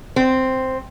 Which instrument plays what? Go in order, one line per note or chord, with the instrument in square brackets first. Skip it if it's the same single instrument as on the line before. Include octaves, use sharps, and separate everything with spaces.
[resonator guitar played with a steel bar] C4